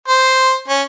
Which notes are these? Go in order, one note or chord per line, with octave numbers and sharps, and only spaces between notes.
C5
C#4